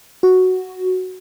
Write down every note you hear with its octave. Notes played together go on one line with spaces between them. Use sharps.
F#4